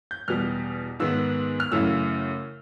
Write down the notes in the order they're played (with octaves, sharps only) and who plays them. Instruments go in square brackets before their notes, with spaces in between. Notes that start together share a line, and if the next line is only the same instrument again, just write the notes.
[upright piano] G6
E2 B2 G3 F6
G#2 D#3 G#3 B3 E6
F6
F#2 C#3 E3 A3 E6